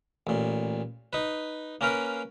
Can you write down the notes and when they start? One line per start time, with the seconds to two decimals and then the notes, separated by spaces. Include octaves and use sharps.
0.27 A1 A#2
1.13 D#4 B4
1.81 A#3 C#4 A#4 B4 F5